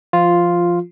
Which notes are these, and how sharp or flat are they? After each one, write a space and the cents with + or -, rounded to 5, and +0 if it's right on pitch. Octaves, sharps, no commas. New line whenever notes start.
F3 -15 F4 +0